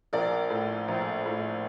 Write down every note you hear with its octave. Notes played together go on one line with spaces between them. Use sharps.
A#1 A#4 D5
A2
A#1
A2